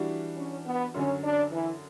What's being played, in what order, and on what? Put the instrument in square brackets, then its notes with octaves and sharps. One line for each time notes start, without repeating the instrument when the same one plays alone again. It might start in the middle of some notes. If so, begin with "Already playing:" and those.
Already playing: [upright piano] E3 G3 D4 F#4
[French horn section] C#4
B3
[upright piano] F#2 D3 F#3 [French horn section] C#4
[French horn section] D4
E3